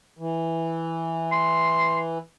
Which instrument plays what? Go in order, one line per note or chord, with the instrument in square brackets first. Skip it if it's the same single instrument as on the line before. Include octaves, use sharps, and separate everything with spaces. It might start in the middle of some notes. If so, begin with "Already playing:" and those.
[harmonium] E3
[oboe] C6